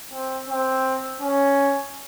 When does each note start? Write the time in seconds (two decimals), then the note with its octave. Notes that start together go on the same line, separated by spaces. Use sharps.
0.12 C4
0.48 C4
1.20 C#4